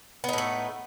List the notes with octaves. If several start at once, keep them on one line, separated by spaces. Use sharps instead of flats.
A2 A3 B3 D#4